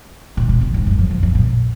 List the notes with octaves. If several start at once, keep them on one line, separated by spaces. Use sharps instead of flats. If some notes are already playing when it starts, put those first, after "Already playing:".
A#2
B2
A#2
G#2
F#2
F#2
F2
F#2
A#2